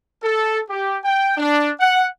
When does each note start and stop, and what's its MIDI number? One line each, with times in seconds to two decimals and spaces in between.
0.23 0.60 69
0.69 0.98 67
1.04 1.34 79
1.37 1.71 62
1.80 2.07 78